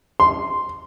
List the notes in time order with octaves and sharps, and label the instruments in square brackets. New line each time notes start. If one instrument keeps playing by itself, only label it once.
[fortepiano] C6